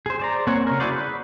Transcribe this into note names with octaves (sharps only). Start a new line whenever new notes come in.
G#4 C5
C5 D5 A#5
A#3 C4 C#5 F#5 G#5
C#3 A#4
E4 F#4 G#4 C5 D5
B4